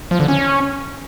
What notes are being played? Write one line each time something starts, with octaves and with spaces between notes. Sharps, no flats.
F3
D3
C#4